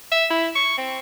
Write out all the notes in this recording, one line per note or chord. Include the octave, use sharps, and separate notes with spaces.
E5
E4
C#6
C4